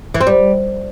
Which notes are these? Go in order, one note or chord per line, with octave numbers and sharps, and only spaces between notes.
E3
C4
G3